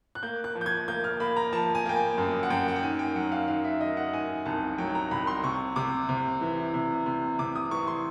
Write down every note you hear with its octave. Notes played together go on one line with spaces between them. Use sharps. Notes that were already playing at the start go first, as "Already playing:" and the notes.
F#6
A#3 G6
F#6
F3
G6
G#6
A#3 G6
F6
A#3 B5
A#5
F3 A5
G#5
A#3 G5
G#5
F#2
F#5
F#2 G5
F#5
G5
D#3 G#5
G5
F#3 F#5
F5
D#3 F5
E5
D#3 D#5
F#5
D#3 G#5
C2 A5
F#3 G5
A#5
C2 B5
C6
C3 C#6
C3 D6
C3
E3
C3
C3
C3 D6
D#6
E3 C#6
C6